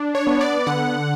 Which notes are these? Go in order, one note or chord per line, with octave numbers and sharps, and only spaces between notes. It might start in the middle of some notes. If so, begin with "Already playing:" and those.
Already playing: D4
C#5
B3
D5
D3 F#5